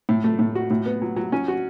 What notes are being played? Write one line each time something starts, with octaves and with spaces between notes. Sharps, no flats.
A2
A3
A2
F#4
A2
B3
F#3
F#3
C#4
F#4